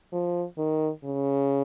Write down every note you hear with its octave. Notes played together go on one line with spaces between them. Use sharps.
F3
D#3
C#3